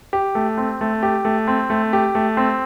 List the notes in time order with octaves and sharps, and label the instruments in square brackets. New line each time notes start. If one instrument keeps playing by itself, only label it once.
[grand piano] G4
A3
C4
A3
G4
A3
C4
A3
G4
A3
C4